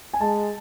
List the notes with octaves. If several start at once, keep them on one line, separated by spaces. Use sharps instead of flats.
G#5
G#3 A5